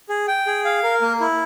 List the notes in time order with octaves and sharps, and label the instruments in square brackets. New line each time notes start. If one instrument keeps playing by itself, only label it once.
[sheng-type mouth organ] G#4
G5
G#4
F5
A#4
A#3
E4